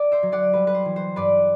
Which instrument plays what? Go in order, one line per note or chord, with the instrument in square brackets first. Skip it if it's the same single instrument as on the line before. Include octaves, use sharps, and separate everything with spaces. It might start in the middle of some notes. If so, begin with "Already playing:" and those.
Already playing: [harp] D5
C5 E5
F#3
D5 F#5
G3 B4
B4
C5
E3
C5
G2 B4 D5